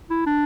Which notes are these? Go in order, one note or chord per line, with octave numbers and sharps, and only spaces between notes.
E4
D4